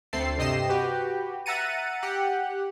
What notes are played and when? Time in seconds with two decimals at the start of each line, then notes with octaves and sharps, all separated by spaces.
0.13 D2 A3 C4 A4 A6 C7
0.37 G2 C3 G4 D#5 C7 E7
0.69 F#4 G4 B4
1.46 E5 F#5 A#5 A6 C#7 D#7
2.03 G4 F#5